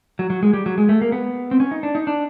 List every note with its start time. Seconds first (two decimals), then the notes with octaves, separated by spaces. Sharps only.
0.19 F#3
0.30 F#3
0.43 G#3
0.53 G3
0.66 F#3
0.78 G#3
0.89 A3
1.01 A#3
1.12 B3
1.51 C4
1.60 C#4
1.71 D#4
1.83 D4
1.95 D#4
2.07 D4